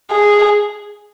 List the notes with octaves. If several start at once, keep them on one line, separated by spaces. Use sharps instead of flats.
G#4